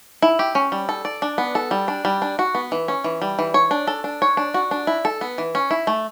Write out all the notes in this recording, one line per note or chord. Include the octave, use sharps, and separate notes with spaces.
E4
G4
C#4
G3
A4
D5
D4
B3
A4
G3
D4
G3
D4
F#4
B3
E3
C#4
E3
G3
E3
C#5
D4
A4
D4
C#5
D4
F#4
D4
E4
A4
B3
E3
C#4
E4
A3